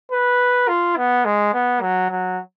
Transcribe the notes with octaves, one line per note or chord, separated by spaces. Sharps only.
B4
F4
B3
G#3
B3
F#3
F#3